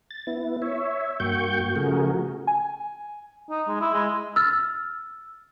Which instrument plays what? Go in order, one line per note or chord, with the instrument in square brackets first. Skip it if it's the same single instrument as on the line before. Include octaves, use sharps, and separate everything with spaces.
[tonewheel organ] A6
B3 E4
C#5 E5
G2 A#3 F#4 G5 C#6 G6
C#3 F3 A3 F#4 G#4 A#4
[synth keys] G#5
[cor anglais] D#4
G#3
E4
G#3
[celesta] E6 F6 A6